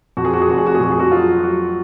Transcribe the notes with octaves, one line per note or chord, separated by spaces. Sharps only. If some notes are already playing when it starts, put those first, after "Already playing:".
F2 F#4
G#4
F#4
G#4
F1 F#4
G#4
F#4
G#4
F2 F#4
G#4
F#4
F#3 F4
F#3 F#4